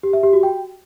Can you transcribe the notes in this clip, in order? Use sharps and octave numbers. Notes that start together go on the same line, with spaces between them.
G4
E5
G4
F#4
G5